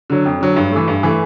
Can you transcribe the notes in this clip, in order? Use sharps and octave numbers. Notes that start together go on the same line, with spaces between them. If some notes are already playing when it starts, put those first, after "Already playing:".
D3 F#3
F2
D3 F#3
G2
E3 A3
G2
E3 A3